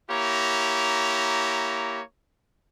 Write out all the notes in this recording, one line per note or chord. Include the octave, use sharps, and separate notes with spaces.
A#3 E4 G4 C#5 A#5